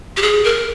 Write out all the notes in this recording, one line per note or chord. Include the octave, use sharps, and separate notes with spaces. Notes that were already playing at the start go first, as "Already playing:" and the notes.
G4
G#4
A#4